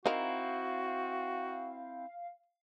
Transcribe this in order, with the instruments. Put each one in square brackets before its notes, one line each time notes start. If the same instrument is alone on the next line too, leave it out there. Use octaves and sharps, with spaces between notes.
[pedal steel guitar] C4 E4 [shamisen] D#4 A#4 [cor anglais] F#4 [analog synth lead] F5